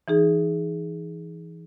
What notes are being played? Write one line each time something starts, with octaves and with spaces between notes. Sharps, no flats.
E3 D#4 G#4